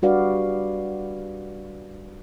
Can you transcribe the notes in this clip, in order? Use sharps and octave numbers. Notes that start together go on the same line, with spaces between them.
G3 D4 F#4 B4 D5 F5